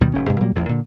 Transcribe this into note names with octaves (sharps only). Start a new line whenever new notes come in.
D2 B2 D#3 G3
F1 G#2 C#4
G2 C3 G#3
A#2 F#3 G3 A#3
A1 E2 F3
A#2 D3